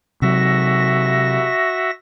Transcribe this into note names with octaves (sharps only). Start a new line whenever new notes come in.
C3 F#3 F#4 E5 A#6